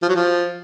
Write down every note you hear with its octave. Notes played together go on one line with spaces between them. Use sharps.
F3
F#3
F3